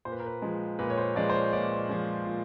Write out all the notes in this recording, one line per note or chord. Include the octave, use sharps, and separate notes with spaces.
A#2 C5
B4
A#4
B4
F3 G#3
A#2 B4
C#5
C5
F3 G#3 D5
C5
C#5
A#2 D5
F3 G#3
A#2